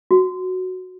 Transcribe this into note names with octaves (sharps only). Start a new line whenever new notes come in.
F#4